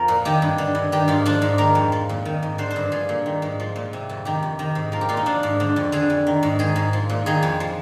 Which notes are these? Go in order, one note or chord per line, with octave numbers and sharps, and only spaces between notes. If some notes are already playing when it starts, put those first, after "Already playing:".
Already playing: F2 F3 A#4
A#2
D#3 G4
G2
D3
G2
D#3 G4
G#2 F4
F3 D4
G#2
D#3 A#4
F2
F3
A#2
D#3
G#2
D3 C5
C5
G2
F3 G#4
A#2
D#3
G#2
F3
A#2
C3
F2
D#3 G4
F2
D#3
G#2
F3 A#4
G4
A#2 F4
D#4
F3 D4
G#2
D3
F2
D3 G#4
F2
D#3
G#2
D#3 G#4
G#2
F3
A#2
D#3 G#4
F2
F3